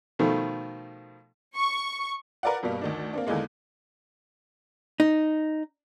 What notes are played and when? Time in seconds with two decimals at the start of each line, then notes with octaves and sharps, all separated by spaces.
0.19 B2 D#3 F3 A3
1.56 C#6
2.43 A#4 B4 D5 F5 F#5
2.63 G2 B2 G3 A#3
2.81 D2 D#3 D4
3.13 A#3 C4 D4
3.27 E2 D3 D#3 G#3 A#3
5.00 D#4